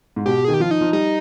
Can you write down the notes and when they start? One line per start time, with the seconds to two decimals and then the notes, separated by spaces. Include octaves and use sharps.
0.16 G#2
0.26 B2 G4
0.45 D#3 G#4
0.54 G4
0.60 F3 F4
0.71 D#4
0.81 F3
0.93 G3 D#4